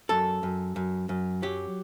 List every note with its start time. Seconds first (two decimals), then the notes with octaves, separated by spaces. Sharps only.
0.09 F#2 A4
0.43 F#2
0.76 F#2
1.09 F#2
1.42 F#3 G4